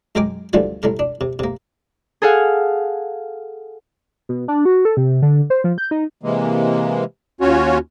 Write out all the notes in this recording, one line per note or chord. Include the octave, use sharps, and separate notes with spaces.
F#2 G#3 A#4 G5 G#5 D6
D2 D3 E3 F3 G3 G#5
C2 A2 A3 A#4
D4
C3
C3 A#3
G#4 A4 F5 F#5 G#5
B2
D4
F#4
A4
C3
D3
C5
F3
G6
D#4
C3 E3 G#3 A#3
D#2 C#4 F4 F#4 C#5